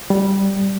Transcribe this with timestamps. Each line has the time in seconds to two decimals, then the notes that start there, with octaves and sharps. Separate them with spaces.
0.10 G3